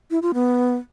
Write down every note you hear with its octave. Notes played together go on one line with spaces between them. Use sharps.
E4
F4
B3